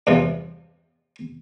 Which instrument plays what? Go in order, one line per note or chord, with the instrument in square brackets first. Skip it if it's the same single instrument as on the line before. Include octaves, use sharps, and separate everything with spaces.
[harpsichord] E2 G2 C3 E3 F3